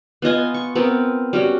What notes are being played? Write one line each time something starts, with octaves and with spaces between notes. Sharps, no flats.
B3 F4 D#5 G#5
C#6
B3 C4 A#4
G3 C#4 F#4